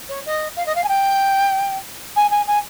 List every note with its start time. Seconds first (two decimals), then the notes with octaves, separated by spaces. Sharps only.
0.09 C#5
0.26 D#5
0.56 F5
0.66 D#5
0.75 F5
0.84 G#5
0.88 G5
2.16 G#5
2.31 G#5
2.47 G#5